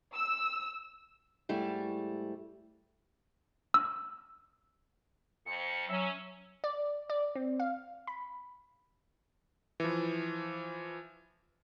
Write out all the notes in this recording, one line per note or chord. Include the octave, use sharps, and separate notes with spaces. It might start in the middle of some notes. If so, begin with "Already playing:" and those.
E6
G#2 G3 A3 E4
E6
F2 C#7
F#3 C#4 E5
D5
D5
C4
F5
B5
E3 F3